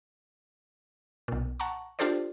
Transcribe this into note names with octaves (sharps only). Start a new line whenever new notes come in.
B1 A#2
F#5 A5 A#5 C#6
D4 F4 G4 A4 C5 D5